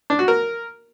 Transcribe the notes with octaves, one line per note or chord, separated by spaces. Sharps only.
D4
F#4
A#4